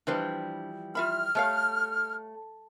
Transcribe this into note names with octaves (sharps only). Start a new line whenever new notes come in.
E3 F3 G3 D4 B4 C5
F4 E5 B5 F6
A3 G4 C#5 F5